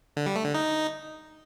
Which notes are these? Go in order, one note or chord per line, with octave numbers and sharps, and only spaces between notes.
D3
G3
A3
D3
D#4